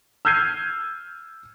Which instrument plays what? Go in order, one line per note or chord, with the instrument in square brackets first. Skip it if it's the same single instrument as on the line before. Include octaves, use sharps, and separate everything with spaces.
[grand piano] E6 F6 G6 G#6 C7 D#7